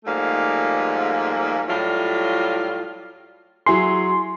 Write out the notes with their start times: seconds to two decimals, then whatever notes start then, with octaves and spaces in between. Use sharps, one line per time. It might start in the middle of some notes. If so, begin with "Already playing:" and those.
0.05 G#2 F3 G3 A3 A#3
1.68 A2 F#3 G3 E4 F4
3.66 F#3 E4 G#4 C6